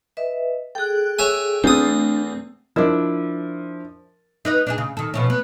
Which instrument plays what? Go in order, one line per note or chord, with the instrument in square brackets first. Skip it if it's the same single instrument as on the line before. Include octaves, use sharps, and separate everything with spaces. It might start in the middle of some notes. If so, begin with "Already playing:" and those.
[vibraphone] B4 D#5 E5
[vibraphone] G#4 A4 [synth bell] G5 F#6
[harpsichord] C#5 E5 G#5
[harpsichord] E2 D#6 [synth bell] A3 C4 [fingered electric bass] D4
[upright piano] F3 [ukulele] D4 E4 [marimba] A#4 D5 D#5
[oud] D#4 B4 D#5
D4 D#4 G#4
C#3
D#3 A4
B2 F3 C#4
B3